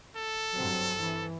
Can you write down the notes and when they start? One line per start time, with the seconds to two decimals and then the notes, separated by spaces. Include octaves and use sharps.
0.16 A4
0.55 G2 F#3 C4
1.01 E3